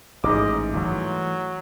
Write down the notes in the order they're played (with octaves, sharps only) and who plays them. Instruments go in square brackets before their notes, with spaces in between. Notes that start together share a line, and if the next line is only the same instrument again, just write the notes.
[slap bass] A1 [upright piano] G#2 D6 [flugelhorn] D#5
[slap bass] E3 G3 A3 [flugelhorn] F#3